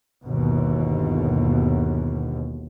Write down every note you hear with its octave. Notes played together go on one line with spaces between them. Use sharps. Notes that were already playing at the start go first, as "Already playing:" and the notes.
G1 D#2 B2